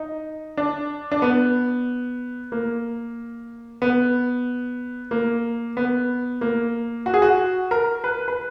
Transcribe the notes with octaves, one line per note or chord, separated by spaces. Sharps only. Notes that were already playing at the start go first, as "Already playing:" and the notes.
Already playing: D#4
D4
D4
B3
A#3
B3
A#3
B3
A#3
F#4
G#4
F#4
A#4
B4
B4